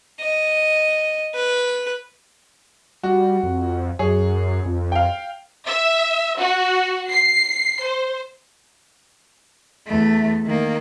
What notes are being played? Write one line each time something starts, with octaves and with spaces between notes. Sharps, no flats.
D#5
B4
G3 F#4
F2
F#2 G#4 C#5
F2
F5 G5
E5
F#4
C7
C5
E2 A3
D#3 A#3